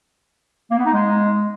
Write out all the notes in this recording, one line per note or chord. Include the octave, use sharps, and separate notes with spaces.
A#3
B3
D#4
G#3